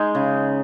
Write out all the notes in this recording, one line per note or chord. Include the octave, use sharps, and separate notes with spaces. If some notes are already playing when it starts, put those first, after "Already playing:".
Already playing: G#3 D#4 G#4
C#3